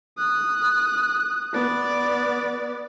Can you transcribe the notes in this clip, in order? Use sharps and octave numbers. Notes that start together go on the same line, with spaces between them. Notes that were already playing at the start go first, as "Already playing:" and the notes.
D#6 F#6
B3 D5